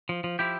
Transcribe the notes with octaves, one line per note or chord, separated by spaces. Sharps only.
F3
F3
F3 E4 G4